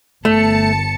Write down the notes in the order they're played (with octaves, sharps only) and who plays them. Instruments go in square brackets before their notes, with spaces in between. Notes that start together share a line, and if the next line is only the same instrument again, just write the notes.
[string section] G1 A5 C#7 [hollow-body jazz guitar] A3